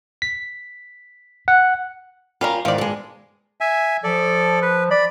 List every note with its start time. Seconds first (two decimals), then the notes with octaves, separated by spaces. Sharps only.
0.22 B6
1.48 F#5
2.41 G3 C#4 F4 A#4 F5
2.65 E2 G#2 D#3 D5 F5
2.78 G2 G#3
3.61 E5 G#5
4.04 F3 A4 D5
4.62 B4
4.91 D5 B5